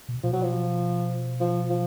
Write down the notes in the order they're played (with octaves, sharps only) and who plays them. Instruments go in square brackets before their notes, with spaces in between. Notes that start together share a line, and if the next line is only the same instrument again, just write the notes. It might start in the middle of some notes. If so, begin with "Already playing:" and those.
[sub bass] B2
[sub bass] B2 [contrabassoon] F3
[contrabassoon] F#3
F3
F3
F3